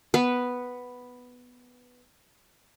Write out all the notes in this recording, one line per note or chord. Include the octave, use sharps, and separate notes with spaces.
B3 B4